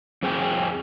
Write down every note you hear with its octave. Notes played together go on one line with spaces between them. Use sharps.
F2 C4 G#4 G5 G#5